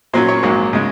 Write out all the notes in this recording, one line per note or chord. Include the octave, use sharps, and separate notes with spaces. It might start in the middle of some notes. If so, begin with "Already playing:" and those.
A#2 F#3 C#4 C5
C#5
A#1 G#2 F#3 A#3
C#3 G#3